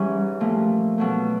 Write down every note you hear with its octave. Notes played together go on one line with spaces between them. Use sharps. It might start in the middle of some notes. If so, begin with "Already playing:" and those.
Already playing: G#2 E3 G3 C#4
A#2 F3 A3
B2 F#3 A3